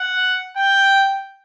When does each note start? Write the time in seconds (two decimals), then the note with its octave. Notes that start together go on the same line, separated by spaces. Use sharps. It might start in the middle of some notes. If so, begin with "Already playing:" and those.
Already playing: F#5
0.57 G5